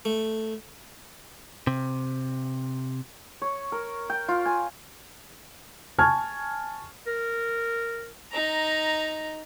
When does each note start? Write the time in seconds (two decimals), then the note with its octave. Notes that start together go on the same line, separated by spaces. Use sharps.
0.05 A3
1.67 C3
3.42 C#5
3.72 A#4
4.10 G5
4.28 F4
4.45 G#5
5.98 G#5 A5 C#6 F6 G#6
7.07 A#4
8.32 D#4 A#5